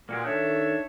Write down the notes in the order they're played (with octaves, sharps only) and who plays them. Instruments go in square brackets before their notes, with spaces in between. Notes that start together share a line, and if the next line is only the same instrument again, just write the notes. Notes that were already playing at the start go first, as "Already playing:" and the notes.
[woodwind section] A#2 G#3 [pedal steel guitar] A#3 F#4 G4
[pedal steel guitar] D#3 A4 G6 [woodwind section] D4 C#5 E5